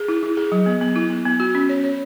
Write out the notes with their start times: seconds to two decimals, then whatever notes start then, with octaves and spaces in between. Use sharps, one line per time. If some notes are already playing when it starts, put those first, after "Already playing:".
Already playing: G#4
0.08 E4
0.23 E4
0.37 G#4
0.52 F#3
0.66 B3
0.81 B3
0.96 E4
1.10 B3
1.25 B3
1.40 F#4
1.55 C#4
1.69 C#5
1.84 C#5